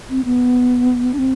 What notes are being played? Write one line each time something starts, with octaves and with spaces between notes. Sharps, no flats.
C4
B3
D4
C4